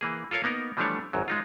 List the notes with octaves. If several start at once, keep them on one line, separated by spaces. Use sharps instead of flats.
E3 A#3 G#4
F4 A4 A#4 C#5 F5
A#3 B3 D#4 A#4
E3 F3 G3 A3 D4 C#5
G#1 F#2 F#3
G#3 D#4 F4